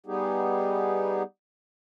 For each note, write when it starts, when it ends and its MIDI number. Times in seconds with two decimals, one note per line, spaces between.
0.06 1.23 55
0.06 1.23 59
0.06 1.23 63
0.06 1.23 67
0.06 1.23 68